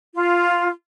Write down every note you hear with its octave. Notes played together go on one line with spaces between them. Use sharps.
F4